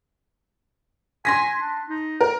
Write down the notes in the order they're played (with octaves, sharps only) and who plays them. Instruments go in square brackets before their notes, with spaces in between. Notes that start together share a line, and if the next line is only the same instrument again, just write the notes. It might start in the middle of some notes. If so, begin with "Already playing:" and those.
[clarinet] G#5 [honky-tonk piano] C6 A#6 B6
[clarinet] D4
D#4
[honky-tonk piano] A#4